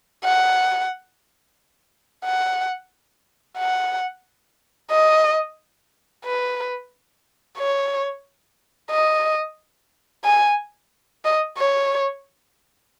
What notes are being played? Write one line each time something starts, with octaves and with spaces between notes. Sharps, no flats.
F#5
F#5
F#5
D#5
B4
C#5
D#5
G#5
D#5
C#5